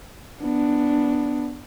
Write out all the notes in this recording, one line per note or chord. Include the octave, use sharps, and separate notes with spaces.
B3 D4